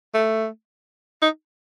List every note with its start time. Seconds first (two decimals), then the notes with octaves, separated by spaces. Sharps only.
0.14 A3
1.22 D#4